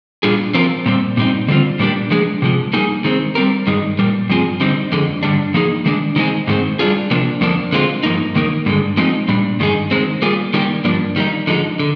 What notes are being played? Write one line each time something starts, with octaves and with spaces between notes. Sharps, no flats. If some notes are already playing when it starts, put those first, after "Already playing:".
A#2 G3 D4 F4 G#4
F3 C4 F4 A#4
A#2 G3 C4
A#2 G3 C4 D#4
D3 G3 C4 F4
A#2 G3 A#3 D4 G4
F3 G#3 D4 G#4
C3 F3 G#3
G3 A#3 D#4 G#4
D#3 G#3 C4
G3 C4 G4 A#4
G2 D#3 G#3 D#4
A#2 G3 A#3
G2 F3 C4 F4 G#4
D3 G3 C4 D#4
F2 D3 G#3
G2 D3 G3 D4
F3 A#3 D#4 G#4
D#3 G#3 D4
D#3 G#3 C4 D#4 G#4
G#2 D#3 G#3 C4
G3 D4 F4 G#4
C3 F3 A#3 D4
F2 D3 F3 A#3 D4
D3 G#3 C4 F4
G2 F3 A#3 D#4
D#3 A#3 D#4 A#4
G2 D3 G#3
F3 G#3 C4 D#4
A#2 G3 D4
G2 D#3 G#3 D#4 G#4
D#3 G#3 C4
G3 A#3 F4 G#4
D#3 G3 A#3 D4 G4
G2 F3 A#3 D4
D#3 G3 A#3 D#4
D3 F3 G#3 D#4
D3